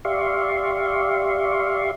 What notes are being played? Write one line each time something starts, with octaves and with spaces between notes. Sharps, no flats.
G4 D5 E5 F5 C6 C#6